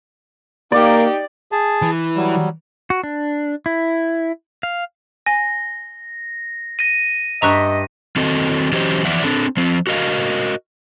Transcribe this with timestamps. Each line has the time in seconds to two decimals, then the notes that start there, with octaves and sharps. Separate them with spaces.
0.72 A#3 D#4 G4 D5
1.52 G#4 A5
1.82 E3
2.16 F#3 G3
2.90 F#4
3.03 D4
3.66 E4
4.63 F5
5.26 G#5 A#6
6.79 A#6 D#7
7.42 G2 D#5 E5 A#5 C#6 F#6
8.16 D#3 C4 F#4 A4 D#5
8.72 E3 F#3 C#4 G4 C5 D#5
9.05 E3 F3 D5 E5 F#5
9.24 C4 D4 A4
9.57 F3 C4
9.87 F#4 A#4 D#5 F5